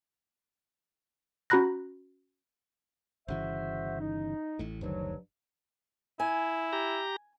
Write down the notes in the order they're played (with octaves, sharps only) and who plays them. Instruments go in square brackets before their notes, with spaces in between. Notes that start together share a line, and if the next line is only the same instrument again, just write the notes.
[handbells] C#4 F#4 A#5 B5 F#6 A#6
[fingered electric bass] G1 C#3 E3 [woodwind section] F#4 C5 E5
[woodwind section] D#4
[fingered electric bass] A1 A2
[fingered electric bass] F#1 D2 D#3 [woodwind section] G2 F3 F#3
[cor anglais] E4 [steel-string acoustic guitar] G#5
[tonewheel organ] G4 A#5